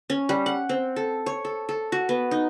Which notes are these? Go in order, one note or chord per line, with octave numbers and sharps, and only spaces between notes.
C#4
G3
F#5
C4
A4
C#5
A4
A4
F#4
B3
D#4